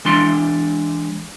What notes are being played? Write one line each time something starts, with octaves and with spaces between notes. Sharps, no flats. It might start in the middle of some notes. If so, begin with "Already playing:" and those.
E3 G#3 D4 C6